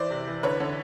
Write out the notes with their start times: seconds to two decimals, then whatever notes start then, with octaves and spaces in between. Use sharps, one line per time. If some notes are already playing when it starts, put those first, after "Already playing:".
Already playing: E3 C5 D5
0.10 C3
0.27 E3
0.43 D3 B4 C#5
0.60 D3